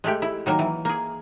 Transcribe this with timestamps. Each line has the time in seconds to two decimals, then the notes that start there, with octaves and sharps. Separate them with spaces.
0.04 G#3 A3 G4
0.22 E4
0.46 D#3 F#3 A#3
0.59 E3
0.85 A#3 G#4